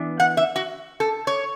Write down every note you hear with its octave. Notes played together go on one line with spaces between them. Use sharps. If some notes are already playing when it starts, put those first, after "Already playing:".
Already playing: E3 B3 D4
F#5
E5
F#4
A4
C#5